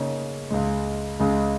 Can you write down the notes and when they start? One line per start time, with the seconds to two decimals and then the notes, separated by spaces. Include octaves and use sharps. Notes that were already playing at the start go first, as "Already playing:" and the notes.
Already playing: C#3 A#3 D#4 C#5
0.50 C#2 C#3 G#3
1.20 C#2 C#3 G#3